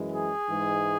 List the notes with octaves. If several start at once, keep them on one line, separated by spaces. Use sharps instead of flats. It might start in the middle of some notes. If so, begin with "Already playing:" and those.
Already playing: F#2 E3 G#3
G#4
G#2 E3 G#3